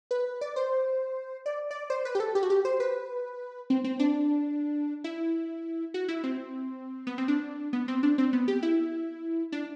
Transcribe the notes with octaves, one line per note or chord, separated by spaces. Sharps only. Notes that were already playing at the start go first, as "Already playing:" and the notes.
B4
D5
C5
D5
D5
C5
B4
G4
A4
G4
F#4
G4
C5
B4
C4
C4
D4
E4
F#4
E4
C4
B3
C4
D4
B3
C4
D4
C4
B3
G4
E4
D4